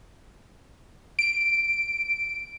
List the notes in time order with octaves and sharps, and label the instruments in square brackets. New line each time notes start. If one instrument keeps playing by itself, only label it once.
[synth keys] D7